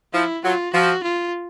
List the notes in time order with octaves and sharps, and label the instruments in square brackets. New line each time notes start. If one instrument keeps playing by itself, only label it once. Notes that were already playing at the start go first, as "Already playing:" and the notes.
[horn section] F3 [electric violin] E4
[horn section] F#3 [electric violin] F4
[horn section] F3 [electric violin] F#4
[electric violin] F4